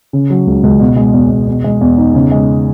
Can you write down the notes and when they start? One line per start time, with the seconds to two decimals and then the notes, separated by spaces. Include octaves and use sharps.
0.13 C#3
0.30 F#3
0.47 C#2
0.63 C#2
0.80 B2
0.96 G#3
1.14 E2
1.31 E2
1.47 B2
1.64 G#3
1.81 E2
1.98 D#4
2.14 C#3
2.31 G#3